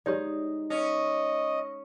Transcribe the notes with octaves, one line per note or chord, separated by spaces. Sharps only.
G#3 D#4 G4 C#5 D5
C#4 D#5